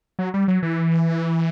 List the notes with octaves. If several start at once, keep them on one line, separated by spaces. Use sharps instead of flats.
F#3
G3
F#3
E3